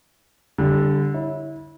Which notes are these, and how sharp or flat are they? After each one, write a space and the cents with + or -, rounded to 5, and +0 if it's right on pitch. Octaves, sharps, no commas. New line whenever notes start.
D3 -15 G3 +10
E4 -25 C#5 +0